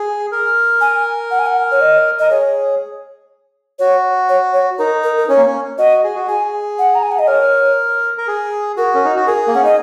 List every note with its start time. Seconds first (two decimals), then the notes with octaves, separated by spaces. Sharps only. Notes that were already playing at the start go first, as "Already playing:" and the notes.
Already playing: G#4
0.32 A#4
0.81 G#5
1.31 F#5
1.39 G#5
1.46 F#5
1.72 C#5
1.81 D#5
2.19 A#4 D#5
2.31 G#4 C#5
3.79 F#4 C#5
4.29 C#5
4.54 C#5
4.79 D#4 A#4
5.04 A#4
5.18 A#4
5.29 C#4 C#5
5.37 A#3
5.46 C#4
5.78 F#4 D#5
6.04 G#4
6.15 F#4
6.27 G#4 G#5
6.79 F#5
6.95 A#5
7.03 G#5
7.12 F#5
7.19 D#5
7.28 A#4 C#5
8.18 A#4
8.27 G#4
8.77 F#4 A#4
8.95 C#4
9.05 D#4
9.16 F#4
9.27 G#4 A#4
9.48 A#3
9.54 C#4 F#5
9.63 D#4 D#5